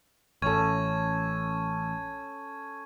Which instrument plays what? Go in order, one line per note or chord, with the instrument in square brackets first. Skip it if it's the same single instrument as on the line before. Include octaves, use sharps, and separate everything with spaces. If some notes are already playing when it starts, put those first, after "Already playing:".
[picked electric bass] A1 [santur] C#4 A4 [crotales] C#6 G#6 D#7